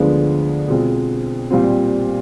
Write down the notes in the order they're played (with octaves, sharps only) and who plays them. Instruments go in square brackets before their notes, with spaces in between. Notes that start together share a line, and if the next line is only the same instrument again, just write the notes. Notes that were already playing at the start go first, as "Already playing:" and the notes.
Already playing: [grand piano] D2 D3 F3 G#3 B3
B2 G#3 C4 F4
A#2 G3 C4 F4